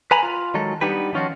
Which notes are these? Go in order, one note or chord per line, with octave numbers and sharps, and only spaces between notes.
B4 G#5 A#5 B5
F4
D#3 F#3 G#3 A4
G3 B3 D4 D#4 G4 B4
D#3 F3 C#4 F4 F#4